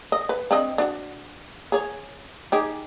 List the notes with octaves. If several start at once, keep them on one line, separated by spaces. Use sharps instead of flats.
D#5
B4
C4 D4 D#5
D4 F#4
G#4 C#5
D#4 G4 G#4